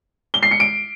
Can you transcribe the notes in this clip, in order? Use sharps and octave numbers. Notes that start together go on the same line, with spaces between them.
G7
C7
C#7
D7